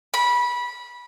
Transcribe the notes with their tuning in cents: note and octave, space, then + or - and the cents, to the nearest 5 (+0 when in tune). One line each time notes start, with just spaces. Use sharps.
B5 -20